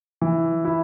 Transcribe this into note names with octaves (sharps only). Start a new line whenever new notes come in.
E3
E4